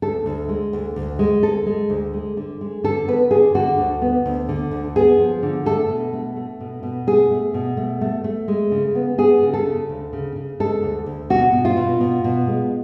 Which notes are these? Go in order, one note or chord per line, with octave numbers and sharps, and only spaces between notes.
D2 A4
D2
G#3
D2
D2
G#3
D2 A4
G#3
D2
G#3
D3
G#3
D3 A4
B3 B4
D3 G#4
D3 F#4
D2
B3
D2
D3
D2
B3 G#4
F3
D3
A3 A4
B2
A3
A3
B2
B2
A3 G#4
A3
B2
A3
A3
A3
G#3
C#3
B3
B3 G#4
C#3
A4
C#3
D2
C#3
C#3
G#3 A4
D2
D2
B2 F#4
B2
F4
B2
B2
B2
G#3